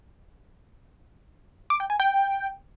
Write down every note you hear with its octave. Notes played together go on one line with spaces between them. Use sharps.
D6
G5
G#5
G5